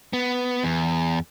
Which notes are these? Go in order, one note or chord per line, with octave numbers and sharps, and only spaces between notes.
B3
E2